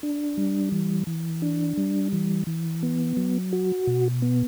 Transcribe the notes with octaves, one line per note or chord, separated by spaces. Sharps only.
D4
G3
E3
E3
D4
G3
E3
E3
B3
F#3
F#4
B2
B3